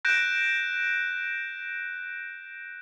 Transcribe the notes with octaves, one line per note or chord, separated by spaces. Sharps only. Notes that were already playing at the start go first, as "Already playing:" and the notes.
F#6 G6 A#6 D7 E7